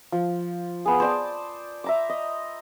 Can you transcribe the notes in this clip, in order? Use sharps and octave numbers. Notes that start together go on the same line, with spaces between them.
F3
B3 G#4
C5 D5 A5
E5 A#5 D6
D#5